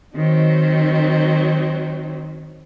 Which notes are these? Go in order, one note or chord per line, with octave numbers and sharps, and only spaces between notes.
D#3 F#3 C4 D#4